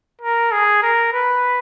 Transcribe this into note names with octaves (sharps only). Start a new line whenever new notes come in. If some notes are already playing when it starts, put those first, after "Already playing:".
A#4
G#4
A#4
B4